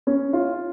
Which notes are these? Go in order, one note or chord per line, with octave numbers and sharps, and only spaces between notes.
C#4
F4